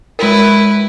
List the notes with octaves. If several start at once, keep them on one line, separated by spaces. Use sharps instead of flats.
G#3 E4 A#4 B4